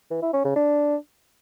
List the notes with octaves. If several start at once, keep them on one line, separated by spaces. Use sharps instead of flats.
E3
E4
C#4
C#3
D4